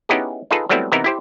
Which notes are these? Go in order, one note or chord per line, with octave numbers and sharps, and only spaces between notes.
B3 C#4 D#4 E4 G4 G#4
D#4 F4 G#4 A4 B4
F#3 G3 A3 B3 C4 E4
C3 E3 B3 D#4 E4 A#4
E4 G4 C5